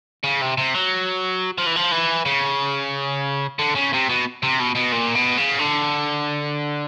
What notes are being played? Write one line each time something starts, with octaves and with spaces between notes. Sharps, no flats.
C#3
C3
C3
F#3
F3
E3
F3
E3
C#3
D3
C#3
C3
B2
C3
B2
B2
A#2
B2
C#3
D3